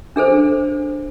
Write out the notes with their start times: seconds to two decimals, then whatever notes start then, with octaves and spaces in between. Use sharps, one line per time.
0.16 D4 G#4 A4 C5